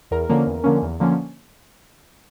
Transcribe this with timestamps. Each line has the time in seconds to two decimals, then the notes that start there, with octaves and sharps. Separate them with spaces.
0.11 E2 A#4
0.29 D3 F3 A#3 C#4
0.46 E2
0.64 D3 F3 A#3 C#4
0.82 E2
1.00 D3 F3 A#3 C#4